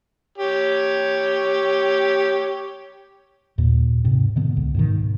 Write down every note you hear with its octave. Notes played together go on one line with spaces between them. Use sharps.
G4 C#5
D#2 A#2
G#2 C3
B2 D3 B3
C#2
G#2 B2 D#3